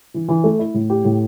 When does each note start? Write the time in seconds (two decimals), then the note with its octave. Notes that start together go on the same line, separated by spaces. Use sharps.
0.14 E3
0.28 E3
0.44 A3
0.59 E4
0.74 A2
0.90 G4
1.05 A2